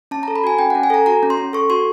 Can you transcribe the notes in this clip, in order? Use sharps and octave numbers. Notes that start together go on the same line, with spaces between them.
C#4 A5
A#5
A4
B5
F#4 G#5
C#4 G5
F#5
C#4
G#5
A4 A#5
F#4 A#5
C#4
C6
C#4
A4 C#6
F#4 C6